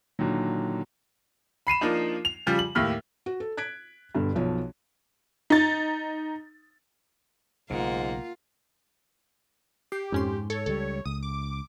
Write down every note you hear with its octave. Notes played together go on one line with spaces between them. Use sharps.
A#2 D3 D#3 F#3
B5 C7 D#7 E7
F3 A#3 D4 D#4
F7
C#3 F3 G3
F#7
D#2 A2 G4 F6
F#4
A4
F#6 G#6 B6 D7
G2 B2 D3
B1 F3 C#5
D#4 A6
B1 G#2 C#3 A#3 F4 F#5
G4 C7
F2 G#2 C#4 C6
A4 C#5
C#2 G3 A4
C#2 D#6
D6